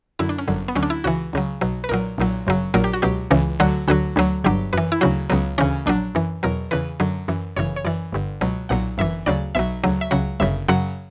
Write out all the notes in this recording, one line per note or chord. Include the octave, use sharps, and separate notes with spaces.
F#2 D3 F#3 E4
D4
C#4
G1 F#2 D3 F#3
B3
D2 D3 F#3 C#4
D4
E4
C#2 C#3 E3 F#4
C#2 C#3 F#3
B1 B2 F#3
B4
B1 A#2 F#3 A#4
B1 A#2 F#3
G1 F#2 C#3 F#3
A#1 A#2 F#3 A#4
G4
F#4
C#2 B2 F#3 G4
C#2 C#3 E3
D2 D3 F#3 F#4
D2 D3 F#3 F#4
D2 D3 F#3
G1 G2 F#3 G4
F#2 E3 B4
E4
D2 C#3 F#3 F#4
C#2 C#3 F#3 B3
D2 C#3 E3 C#4
A#1 A#2 F#3 D4
F#2 E3
E2 B2 F#3 A#4
E2 C#3 E3 B4
F#2 D3 F#3
F#2 E3
G1 F#2 C#3 E3 C#5
C#5
F#2 E3 D5
G1 G2 D3
C#2 B2 F#3
B1 A#2 F#3 F#5
G1 F#2 E3 E5
D2 C#3 F#3 D5
B1 B2 F#3 E5
D2 C#3 F#3
E5
C#2 C#3 F#3 F#5
G1 F#2 C#3 E5
F#2 C#3 F#3 F#5